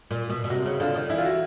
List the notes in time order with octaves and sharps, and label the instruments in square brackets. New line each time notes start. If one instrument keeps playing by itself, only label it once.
[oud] A#2
B2
B2
[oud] C3 [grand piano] F#4
[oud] C#3
[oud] D3 [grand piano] F4
[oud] D#3
[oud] E3 [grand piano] E4
[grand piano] F4
F#4